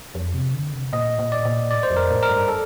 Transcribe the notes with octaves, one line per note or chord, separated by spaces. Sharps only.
F2
C3
D3
C3
A#2 D#5
A#2
D5
A#2
A2 D5
C5
F2
A#4
A2
A#4
G2
A4